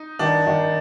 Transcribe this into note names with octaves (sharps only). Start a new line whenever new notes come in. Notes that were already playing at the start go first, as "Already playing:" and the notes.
Already playing: D#4
D#3 D4
D#3